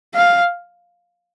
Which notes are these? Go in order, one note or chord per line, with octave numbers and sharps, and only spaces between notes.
F5